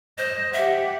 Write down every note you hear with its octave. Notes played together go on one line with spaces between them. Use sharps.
C5 D#5
G4 E5 F#5